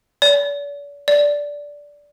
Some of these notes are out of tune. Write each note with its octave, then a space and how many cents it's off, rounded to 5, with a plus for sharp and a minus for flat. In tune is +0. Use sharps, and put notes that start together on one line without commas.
D5 -45
D5 -10